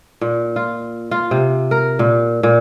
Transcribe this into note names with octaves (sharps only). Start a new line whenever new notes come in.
A#2
F4
F4
C3
A#4
A#2
A#2